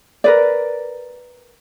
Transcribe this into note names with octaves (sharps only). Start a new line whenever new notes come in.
A#4 B4 D5